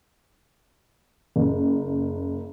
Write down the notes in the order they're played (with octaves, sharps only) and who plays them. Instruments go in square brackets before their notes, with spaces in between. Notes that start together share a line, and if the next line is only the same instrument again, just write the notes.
[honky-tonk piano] F#1